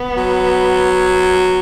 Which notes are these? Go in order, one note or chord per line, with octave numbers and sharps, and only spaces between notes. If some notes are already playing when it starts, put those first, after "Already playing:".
Already playing: B3
F#3